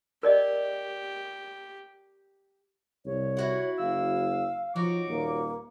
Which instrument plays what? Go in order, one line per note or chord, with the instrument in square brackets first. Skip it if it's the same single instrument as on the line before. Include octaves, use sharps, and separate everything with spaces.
[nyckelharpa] G4 [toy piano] A#4 D5 D#5
[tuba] C2 [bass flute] C#5
[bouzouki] E4 F#4 F#5
[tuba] F#1 [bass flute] F5 [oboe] E6
[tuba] F3 [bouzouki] D#4 F#4 C#5 [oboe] D6
[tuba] D#1 [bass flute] A#3